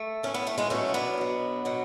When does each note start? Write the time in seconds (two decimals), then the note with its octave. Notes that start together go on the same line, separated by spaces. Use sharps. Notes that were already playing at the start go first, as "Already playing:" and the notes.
Already playing: A3
0.23 A2 E3 C#4
0.34 B3
0.47 A3
0.58 G#3 B3
0.70 B2 F#3 A3 C#4
0.94 B3 D4
1.18 B2 F#3
1.65 B2 F#3